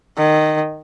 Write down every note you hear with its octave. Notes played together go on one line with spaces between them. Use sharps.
D#3